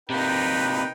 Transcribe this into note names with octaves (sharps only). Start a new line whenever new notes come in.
C3 A#3 D#4 B4 G5